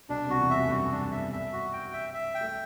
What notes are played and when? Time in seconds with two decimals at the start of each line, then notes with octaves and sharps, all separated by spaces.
0.09 B1 B2 D4
0.25 C2 C3
0.30 F#4
0.40 E2 E3
0.50 E5
0.56 F#2 F#3
0.64 A3
0.71 G2 G3 F#4
0.92 D4
1.11 E5
1.32 E5
1.53 F#4
1.73 G5
1.93 E5
2.14 E5
2.35 G5
2.41 A3